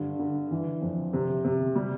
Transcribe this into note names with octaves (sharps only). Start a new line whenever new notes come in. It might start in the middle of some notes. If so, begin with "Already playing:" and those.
Already playing: G2 D3
D3
E3
F2
C3
C3
G3